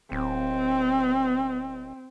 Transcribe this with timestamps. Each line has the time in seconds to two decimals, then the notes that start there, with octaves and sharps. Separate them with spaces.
0.12 D1 C4